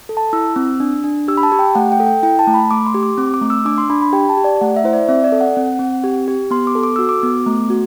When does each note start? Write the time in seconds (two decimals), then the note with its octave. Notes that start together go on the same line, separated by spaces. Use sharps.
0.09 A4
0.17 A5
0.33 E4 E6
0.56 C4
0.80 D4
1.04 D4
1.28 G4 E6
1.37 B5
1.43 A5
1.52 G4
1.59 G5
1.75 A3 F#5
1.92 G5
2.00 A4
2.07 G5
2.23 E4 G5
2.39 A5
2.47 A3
2.54 B5
2.71 A3 D6
2.86 C6
2.95 G4
3.03 D6
3.18 C4 D6
3.34 D6
3.41 A3
3.50 E6
3.65 D4 D6
3.78 C6
3.90 D4 B5
4.02 B5
4.13 G4 G5
4.29 A5
4.37 G4
4.44 D5
4.61 A3 F#5
4.76 E5
4.84 E4 C5
4.93 D5
5.08 C4 E5
5.24 D5
5.32 A4
5.41 F#5
5.57 C4
5.79 C4
6.04 G4
6.28 G4
6.51 B3 C6
6.67 D6
6.75 A4
6.83 D6
6.96 F#4 E6
7.09 D6
7.23 B3
7.46 A3
7.70 F#4